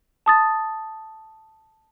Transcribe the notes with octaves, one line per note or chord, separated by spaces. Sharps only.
A5 D#6 A6